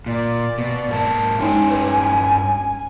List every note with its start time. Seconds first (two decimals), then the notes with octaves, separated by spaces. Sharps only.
0.06 A#2 D5
0.58 B2
0.88 G#2 A#3 A5
1.39 G2 G#3 C#4 D#4 G5 G#5
1.71 B4